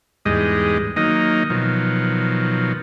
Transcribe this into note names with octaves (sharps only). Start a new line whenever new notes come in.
E2 G#2 G3 G#3 D#5
D#3 F#3 A#3 D#4 D#5
B2 D#3 F3 F#3